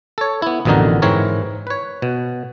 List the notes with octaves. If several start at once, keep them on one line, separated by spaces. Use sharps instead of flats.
A4 C#5
B3 E4
A1 F2 B2 D3 D#4 A#4
G#2 E3 C4 A#4 C#5
B4 C#5
B2